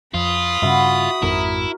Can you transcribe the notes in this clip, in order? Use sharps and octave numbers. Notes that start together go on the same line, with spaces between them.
F2 F4 B5 D#6
G2 C#3 E4 F#4
G#1 F2 G#2 E4 A#4 E5